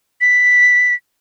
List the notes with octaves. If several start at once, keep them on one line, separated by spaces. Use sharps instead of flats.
B6